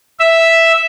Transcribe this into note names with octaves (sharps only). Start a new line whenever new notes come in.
E5